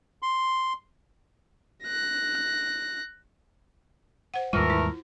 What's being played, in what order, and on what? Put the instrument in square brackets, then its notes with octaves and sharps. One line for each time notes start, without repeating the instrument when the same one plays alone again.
[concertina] C6
[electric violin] F#6 A#6
[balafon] C5 F#5
[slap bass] D#2 G#2 G3 [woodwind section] E3 A3 A#4 [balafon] F4
[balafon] E4